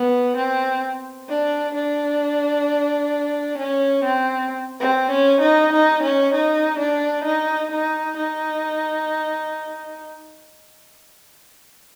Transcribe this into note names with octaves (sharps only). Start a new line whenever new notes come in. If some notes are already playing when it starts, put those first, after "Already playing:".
Already playing: B3
C4
D4
D4
C#4
C4
C4
C#4
D#4
D#4
C#4
D#4
D4
D#4
D#4
D#4